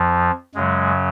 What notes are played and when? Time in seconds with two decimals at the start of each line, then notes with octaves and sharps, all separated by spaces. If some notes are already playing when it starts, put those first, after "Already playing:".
Already playing: F2 F3
0.55 F#2 C#3 F#3 G#3